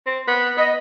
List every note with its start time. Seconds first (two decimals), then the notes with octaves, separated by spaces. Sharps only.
0.06 C4
0.28 B3
0.57 B3 D#5